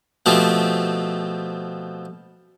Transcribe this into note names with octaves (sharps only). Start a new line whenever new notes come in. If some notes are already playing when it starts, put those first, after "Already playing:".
B2 F3 A3 C4 G4